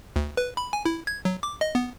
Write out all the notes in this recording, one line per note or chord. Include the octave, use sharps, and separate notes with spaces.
D2
B4
B5
G#5
E4
G#6
F#3
D6
D#5
B3